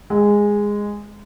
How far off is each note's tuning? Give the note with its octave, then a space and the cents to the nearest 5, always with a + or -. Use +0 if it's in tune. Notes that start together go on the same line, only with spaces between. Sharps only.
G#3 -10